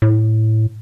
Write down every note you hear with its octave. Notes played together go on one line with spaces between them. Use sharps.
A2